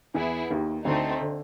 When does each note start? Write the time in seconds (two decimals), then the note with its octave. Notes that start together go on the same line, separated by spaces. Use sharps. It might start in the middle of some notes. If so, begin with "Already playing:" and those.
0.14 E2 E3 B3 E4 G#4
0.50 D#2 D#3
0.85 D2 D3 A3 C4 D#4
1.21 D3